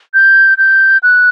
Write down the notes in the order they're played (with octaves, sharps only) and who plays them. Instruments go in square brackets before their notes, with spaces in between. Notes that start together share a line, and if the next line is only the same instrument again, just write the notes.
[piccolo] G6
G6
F#6